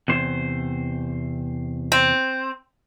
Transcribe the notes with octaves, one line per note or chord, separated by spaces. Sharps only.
E2 C3 C5
C4